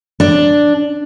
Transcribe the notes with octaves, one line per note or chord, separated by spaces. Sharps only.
D4